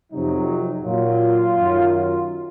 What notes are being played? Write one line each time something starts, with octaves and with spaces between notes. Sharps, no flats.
F2 C3 F#3 D#4
A#2 F#3 F4
F#2 D#3 F#3